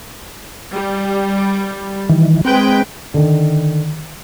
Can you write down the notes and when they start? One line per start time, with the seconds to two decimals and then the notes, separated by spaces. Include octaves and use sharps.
0.73 G3
2.10 D#3 E3
2.45 G#3 C4 B4 G5
3.14 D3 D#3